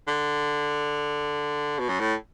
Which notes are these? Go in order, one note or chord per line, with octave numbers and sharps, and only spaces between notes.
D3
B2
F#2
A2